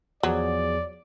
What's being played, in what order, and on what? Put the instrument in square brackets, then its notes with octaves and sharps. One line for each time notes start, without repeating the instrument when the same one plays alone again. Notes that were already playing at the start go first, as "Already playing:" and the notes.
[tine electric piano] E2 F3 G#4 [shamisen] F#3 [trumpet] D5